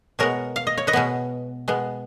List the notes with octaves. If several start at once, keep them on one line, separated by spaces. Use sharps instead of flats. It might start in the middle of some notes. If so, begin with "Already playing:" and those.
B2 G#3 B3 A#4 C#5
F5
D#5
C#5
B4 D#5
B2 G#3 B3
B2 G#3 B3